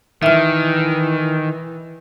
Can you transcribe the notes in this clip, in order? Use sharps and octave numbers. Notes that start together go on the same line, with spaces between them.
D#3 E3 E5 F6